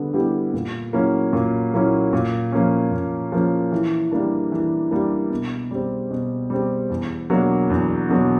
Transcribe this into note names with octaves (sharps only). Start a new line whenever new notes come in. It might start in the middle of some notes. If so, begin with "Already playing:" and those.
Already playing: D3 G3 B3
G3 B3 E4 G4
A#2
F#3 A#3 C#4 E4
A#2
F#3 A#3 C#4 E4
A#2
F3 A#3 C#4
A#2
F3 A#3 C#4
E3
G3 A#3 D4
E3
G3 A#3 D4
B2
G3 C4
B2
G3 C4
E2
B2 F#3 A#3 D4
E2
B2 F#3 A#3 D4